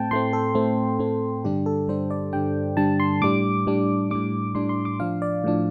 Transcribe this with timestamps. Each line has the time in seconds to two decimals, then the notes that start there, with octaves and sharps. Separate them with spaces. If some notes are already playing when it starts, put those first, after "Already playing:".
Already playing: A2 A3 C4 G5 A5
0.11 A2 A3 C4 C6
0.33 A4
0.55 A2 A3 C4
0.99 A2 A3 C4
1.44 G2 D3 G3 D4 G4
1.66 A4
1.88 G2 D3 G3 D4 C5
2.10 D5
2.32 G2 D3 G3 D4 G5
2.77 G2 D3 G3 D4 A5
3.00 C6
3.21 A2 G3 D4 D6
3.67 A2 G3 D4
4.10 A2 G3 D4 D6
4.55 A2 G3 D4 C6
4.69 C6
4.85 D6
5.00 A2 F3 D4 F5
5.22 D5
5.44 A2 F3 D4